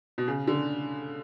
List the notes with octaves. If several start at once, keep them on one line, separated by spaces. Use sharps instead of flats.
B2
C#3
D3